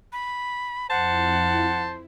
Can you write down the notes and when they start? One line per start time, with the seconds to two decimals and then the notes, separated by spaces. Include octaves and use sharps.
0.13 B5
0.90 F2 E4 C5 F#5 A5